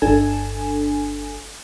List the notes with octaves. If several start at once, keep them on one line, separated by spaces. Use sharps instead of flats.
G1 D4 A4 G#5